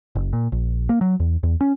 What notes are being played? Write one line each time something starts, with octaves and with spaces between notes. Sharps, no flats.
F#1
A#2
A#1
A#3
F#3
E2
E2
C#4